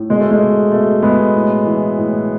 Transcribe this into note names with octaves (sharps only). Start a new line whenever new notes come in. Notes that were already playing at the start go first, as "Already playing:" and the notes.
Already playing: A2
B2 G#3
A3
G#3
B2
B2 A3
B2 G#3 B3
A2
E3
A2